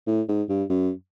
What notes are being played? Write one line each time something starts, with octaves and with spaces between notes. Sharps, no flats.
A2
G#2
G2
F#2